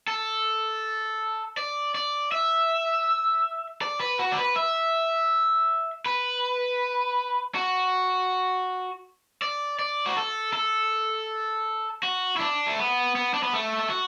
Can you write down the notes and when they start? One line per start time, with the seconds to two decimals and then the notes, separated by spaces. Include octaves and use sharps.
0.08 A4
1.57 D5
1.95 D5
2.32 E5
3.82 D5
4.00 B4
4.19 F#4
4.32 D5
4.38 B4
4.56 E5
6.06 B4
7.55 F#4
9.42 D5
9.79 D5
10.06 F#4
10.17 A4
10.53 A4
12.03 F#4
12.36 E4
12.40 D4
12.67 A3
12.79 B3
13.16 B3
13.34 D4
13.43 B3
13.53 A3
13.79 A4
13.90 F#4